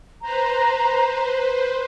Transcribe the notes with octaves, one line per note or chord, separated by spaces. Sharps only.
B4 C5 A#5